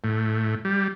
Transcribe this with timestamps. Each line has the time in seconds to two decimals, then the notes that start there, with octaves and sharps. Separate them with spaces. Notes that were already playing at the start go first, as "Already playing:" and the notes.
0.04 A2
0.65 G3